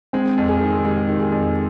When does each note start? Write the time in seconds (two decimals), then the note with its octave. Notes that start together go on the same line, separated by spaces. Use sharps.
0.13 G#3 C4
0.38 F2
0.48 G#4
0.61 D#3
0.85 G#3 G4
1.08 D#3
1.19 G#4
1.32 F2